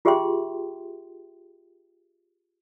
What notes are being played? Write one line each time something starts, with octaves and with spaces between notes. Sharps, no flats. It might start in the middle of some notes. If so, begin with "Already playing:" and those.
F4 G4 G#4 E5 G5 C6